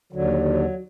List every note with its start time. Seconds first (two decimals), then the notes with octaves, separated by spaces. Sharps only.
0.13 D#2 D3 F#3
0.45 F#3